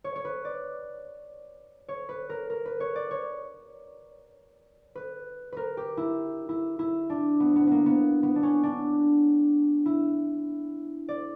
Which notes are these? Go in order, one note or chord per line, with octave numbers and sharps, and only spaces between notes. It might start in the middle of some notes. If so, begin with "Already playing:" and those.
C#5
C#5
B4
D5
C#5
B4
A#4
A#4
B4
C#5
D5
C#5
B4
A#4 B4
G4
E4
E4
E4
D4
B3
B3
A#3 B3
B3
B3
D4
C#4
D4
E4
D5